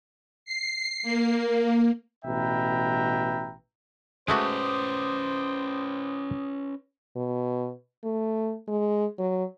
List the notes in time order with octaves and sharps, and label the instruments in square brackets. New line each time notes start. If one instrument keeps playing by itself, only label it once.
[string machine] C7
A#3
[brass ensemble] A1 B2 B4 E5 G5 A#5
[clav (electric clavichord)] G#3 A3 F#4 [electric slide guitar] C#4 B4 [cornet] C5 [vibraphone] D6 D#6
[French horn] B2
A3
G#3
F#3